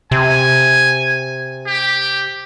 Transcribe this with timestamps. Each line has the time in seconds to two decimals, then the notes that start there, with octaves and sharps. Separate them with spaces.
0.11 C3 G#5
1.66 G4